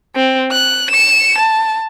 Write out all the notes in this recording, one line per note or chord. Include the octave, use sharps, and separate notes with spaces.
C4
F#6
C#7 E7
A5